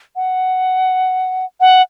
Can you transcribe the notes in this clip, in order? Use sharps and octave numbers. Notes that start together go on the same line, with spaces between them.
F#5
F#5